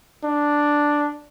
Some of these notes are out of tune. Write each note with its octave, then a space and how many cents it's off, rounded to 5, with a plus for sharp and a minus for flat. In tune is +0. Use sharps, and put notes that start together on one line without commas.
D4 +0